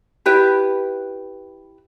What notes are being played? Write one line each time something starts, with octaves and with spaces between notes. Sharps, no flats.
E4 G4 B4 E5